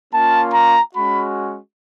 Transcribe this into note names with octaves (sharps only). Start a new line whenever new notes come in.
A#3 C#4 F4 A5
A#5
G#3 C#4 F#4 B5